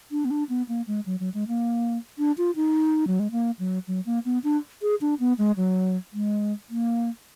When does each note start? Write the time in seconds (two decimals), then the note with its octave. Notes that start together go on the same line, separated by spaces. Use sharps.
0.11 D4
0.25 B3
0.31 D4
0.49 B3
0.69 A#3
0.87 G#3
1.06 F#3
1.20 F#3
1.34 G#3
1.48 A#3
2.18 D4
2.38 F4
2.56 D#4
3.07 F#3
3.19 G#3
3.31 A#3
3.59 F#3
3.88 F#3
4.06 A#3
4.25 B3
4.44 D4
4.82 G#4
5.01 D4
5.20 B3
5.38 G#3
5.57 F#3
6.13 G#3
6.70 A#3